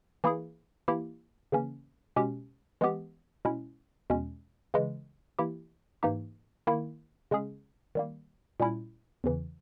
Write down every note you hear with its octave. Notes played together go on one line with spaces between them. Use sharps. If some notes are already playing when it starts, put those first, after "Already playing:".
E3 A#3 E4 G#4
E3 A#3 E4 G4
C#3 E3 A#3 C#4
B2 G#3 C#4 G4
E3 G#3 B3 G4
B2 G#3 C#4 E4
E2 B2 G#3 C#4
C#3 E3 G#3
E3 A#3 E4 G4
G#2 E3 A#3 D#4 G4
D#3 A#3 E4
C#3 G#3 C#4 G#4
D#3 G3 A#3
A#2 G3 C#4 E4
E2 C#3 E3